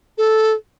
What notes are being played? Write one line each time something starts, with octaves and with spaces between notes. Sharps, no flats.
A4